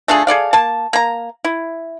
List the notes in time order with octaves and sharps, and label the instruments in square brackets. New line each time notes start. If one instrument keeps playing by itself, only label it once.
[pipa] A3 D4 F4 G#4
G#4 A4 D5 F5
A#3 A5
A#3 A#5
E4